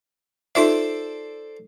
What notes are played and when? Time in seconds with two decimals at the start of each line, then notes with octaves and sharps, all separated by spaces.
0.55 D#4 F4 A4 C5 D5 E5